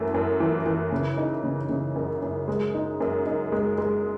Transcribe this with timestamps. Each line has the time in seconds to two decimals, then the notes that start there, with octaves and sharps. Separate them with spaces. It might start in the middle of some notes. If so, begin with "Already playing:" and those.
Already playing: F#2 E3 A3
0.14 F#2
0.40 E3
0.66 E3
0.92 C#3
1.17 D#4
1.43 C#3
1.69 C#3
1.96 F#2
2.22 F#2
2.48 G#3
2.74 D#4
3.00 F#2
3.26 D#4
3.52 G#3
3.78 G#3